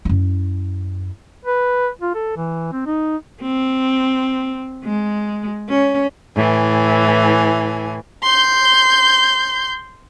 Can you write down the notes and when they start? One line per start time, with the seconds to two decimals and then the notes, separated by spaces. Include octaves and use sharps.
0.05 F#2 E4
1.45 B4
2.02 F4
2.15 A4
2.36 E3
2.72 C4
2.86 D#4
3.42 C4
4.84 G#3
5.69 C#4
6.35 A2 E3 G#5
8.23 C6 G6